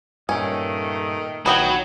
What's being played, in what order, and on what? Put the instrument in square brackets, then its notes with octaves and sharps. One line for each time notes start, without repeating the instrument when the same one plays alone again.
[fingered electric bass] G2 A#2 [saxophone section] D#3 A3 D#5 [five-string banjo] C#4
[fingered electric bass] A#1 D#3 [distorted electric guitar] F#3 [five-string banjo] B4 D#5 G5